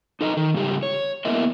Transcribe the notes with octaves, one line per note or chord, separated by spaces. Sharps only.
D#4 A4 D#5 A5 A#5
D#3
G#2 C#3 G3 G4
C#5
A#3 B3 E4 A#4 D#5 E5